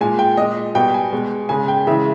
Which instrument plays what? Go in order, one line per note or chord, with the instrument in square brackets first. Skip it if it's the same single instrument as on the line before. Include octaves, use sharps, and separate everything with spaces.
[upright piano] A#2 G#3 G#5
G5
A#2 G#3 D#5
B2 G3 G5
G#5
B2 G#3
C#3 G#3 G#5
G5
C#3 E3 G#3 E5